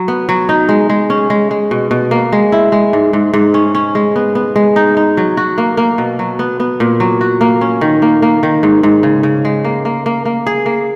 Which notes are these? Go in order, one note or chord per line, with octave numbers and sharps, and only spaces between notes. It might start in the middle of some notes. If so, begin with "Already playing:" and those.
Already playing: F#3
B3
F#3
D#4
G#3
G#3
C#4
G#3
G#3
B2
B2
A#3
G#3
E4
G#3
G#2
G#2
G#2
C#4
C#4
G#3
B3
B3
G#3
D#4
D#4
F#3
F#4
A#3
A#3
B2
F#3
B3
B3
A#2
F#3
F#4
A#3
C#4
D#3
A#3
A#3
D#3
G#2
G#2
C#3
C#3
G#3
A#3
A#3
A#3
A#3
G#4
A#3